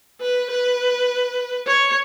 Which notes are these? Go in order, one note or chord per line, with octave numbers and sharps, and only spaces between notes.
B4
B4
C#5